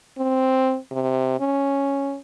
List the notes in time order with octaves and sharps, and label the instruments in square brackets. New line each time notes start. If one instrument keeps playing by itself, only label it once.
[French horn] C4
C3
C#4